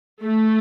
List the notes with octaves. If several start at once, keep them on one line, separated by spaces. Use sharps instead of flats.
A3